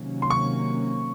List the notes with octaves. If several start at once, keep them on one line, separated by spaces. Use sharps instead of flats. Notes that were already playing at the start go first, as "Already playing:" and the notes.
Already playing: C3 D#3 F#3 A#3 C#4
C6
C#6